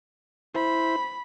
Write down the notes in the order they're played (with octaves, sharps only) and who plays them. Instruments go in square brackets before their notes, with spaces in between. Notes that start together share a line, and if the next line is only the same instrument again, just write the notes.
[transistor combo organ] E4 C5 [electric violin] B5